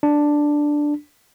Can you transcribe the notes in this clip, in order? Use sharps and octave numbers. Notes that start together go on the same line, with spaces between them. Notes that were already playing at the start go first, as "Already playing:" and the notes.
D4